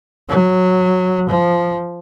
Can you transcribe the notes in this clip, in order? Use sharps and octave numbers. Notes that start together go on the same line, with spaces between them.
F#3
F3